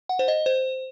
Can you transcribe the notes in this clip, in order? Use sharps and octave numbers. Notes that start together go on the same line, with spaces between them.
F#5
C5
D#5
C5